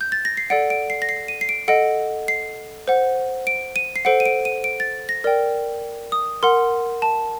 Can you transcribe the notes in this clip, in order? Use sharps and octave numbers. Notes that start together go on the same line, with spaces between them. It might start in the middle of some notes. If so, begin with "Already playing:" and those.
G6
A6
A#6
C7
A4 D5 F#5 D7
D7
C7
A#6
C7
D#7
C7
D7
A4 D#5 F#5 D7
C7
C5 F#5
D7
D#7
C7
A4 C5 F#5 D7
D#7
D7
D#7
D7
A6
A#6
A#4 D5 G5
D#6
A#4 F#5 C6
A5